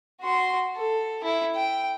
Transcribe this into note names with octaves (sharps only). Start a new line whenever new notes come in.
F#4 C6
A4
E4
G5